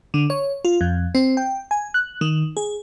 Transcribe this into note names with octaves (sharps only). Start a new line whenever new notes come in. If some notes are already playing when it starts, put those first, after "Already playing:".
D3
C#5
F4
F2
C4
G5
G#5
F#6
D#3
G#4